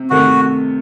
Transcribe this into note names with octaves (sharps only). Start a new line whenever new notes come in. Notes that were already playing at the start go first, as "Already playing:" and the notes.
Already playing: C3
C3 D#3 A3 F#4